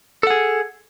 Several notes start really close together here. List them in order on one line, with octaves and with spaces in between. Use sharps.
A4 F#5 G#4